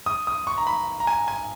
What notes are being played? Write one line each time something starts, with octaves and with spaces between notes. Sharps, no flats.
D#6
D#6
C#6
A#5
B5
A#5
G#5
G#5